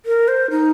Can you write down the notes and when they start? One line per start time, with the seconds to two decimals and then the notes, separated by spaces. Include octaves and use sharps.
0.06 A#4
0.28 C5
0.50 D#4